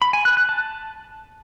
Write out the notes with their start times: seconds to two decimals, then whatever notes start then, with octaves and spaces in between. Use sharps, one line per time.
0.02 B5
0.13 G#5
0.25 F#6
0.37 F#6
0.49 A5